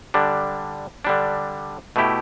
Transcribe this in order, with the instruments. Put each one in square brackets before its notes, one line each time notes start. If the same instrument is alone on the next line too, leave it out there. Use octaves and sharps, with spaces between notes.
[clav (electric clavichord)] D3 G3 D4
D3 G3 D4
B2 A3 E4 G4